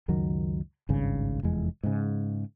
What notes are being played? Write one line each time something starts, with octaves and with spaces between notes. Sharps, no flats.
C#2 F#2 D#3 F#3
G#1 C#2 G2 C#3
F1 E2 G#3
G#2 C#3